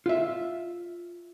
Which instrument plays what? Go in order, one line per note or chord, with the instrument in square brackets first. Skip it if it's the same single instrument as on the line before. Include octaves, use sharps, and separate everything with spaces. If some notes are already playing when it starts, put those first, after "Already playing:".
[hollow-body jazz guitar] F4 E5